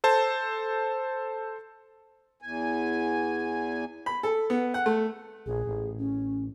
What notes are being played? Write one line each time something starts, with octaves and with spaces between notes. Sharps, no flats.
A4 C5 A5
E2 G#5
B5
A4
B3
F#5
A3
A#1 G#4
A1
C#4